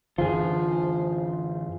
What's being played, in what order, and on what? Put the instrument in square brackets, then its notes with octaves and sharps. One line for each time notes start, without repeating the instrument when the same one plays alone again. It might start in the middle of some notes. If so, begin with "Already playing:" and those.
[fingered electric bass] F#2 D3 E3 [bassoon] F3 [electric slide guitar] F4 G#4